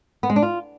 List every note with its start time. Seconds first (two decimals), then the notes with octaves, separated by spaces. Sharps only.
0.23 B3
0.30 G#3
0.36 D4
0.43 F4